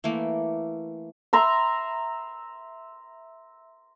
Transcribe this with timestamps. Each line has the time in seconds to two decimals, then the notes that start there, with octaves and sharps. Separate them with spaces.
0.04 E3 A3 A#3
1.33 E5 A#5 C6